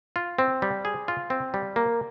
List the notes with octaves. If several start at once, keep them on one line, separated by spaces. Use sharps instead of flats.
F4
C4
G3
G#4
F4
C4
G3
A#3